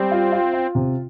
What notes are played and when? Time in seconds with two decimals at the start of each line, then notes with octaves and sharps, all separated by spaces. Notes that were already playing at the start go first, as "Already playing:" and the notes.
Already playing: G3 C4
0.11 F4
0.32 F4
0.53 F4
0.75 C3